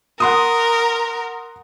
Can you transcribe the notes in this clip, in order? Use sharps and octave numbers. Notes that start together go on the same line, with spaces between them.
A#4 F#5 C6 D#6